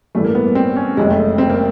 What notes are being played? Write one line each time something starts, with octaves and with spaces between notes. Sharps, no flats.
A1 G2 E3 A3
A#3
B3
C4
C#4
F#1 F2 C3 G#3
A3
C4
A#3